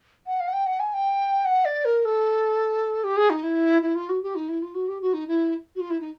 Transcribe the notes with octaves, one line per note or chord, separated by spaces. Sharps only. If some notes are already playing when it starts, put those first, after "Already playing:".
F#5
F5
F#5
G5
F#5
G#5
G5
F#5
D5
A#4
A4
G4
G#4
D#4
E4
E4
F4
F#4
G4
D#4
E4
F4
F#4
G4
F#4
D#4
E4
F#4
F4
E4
D#4